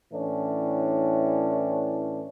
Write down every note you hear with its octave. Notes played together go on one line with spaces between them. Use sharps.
A2 E3 C#4 D4